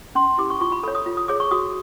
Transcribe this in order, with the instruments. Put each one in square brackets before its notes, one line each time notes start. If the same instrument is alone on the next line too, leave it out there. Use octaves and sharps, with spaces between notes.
[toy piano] C#4 C6
E4 G4 D6
C#6
F4 C#6
B5
A4 C#5 B5
D#6
F4
D#6
G#4 C#5 D6
C#6
F#4 D#6